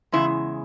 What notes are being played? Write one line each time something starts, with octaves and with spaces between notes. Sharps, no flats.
E2 C#3 G#3 E4